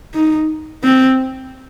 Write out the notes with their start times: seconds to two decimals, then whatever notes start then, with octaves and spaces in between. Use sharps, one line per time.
0.15 D#4
0.84 C4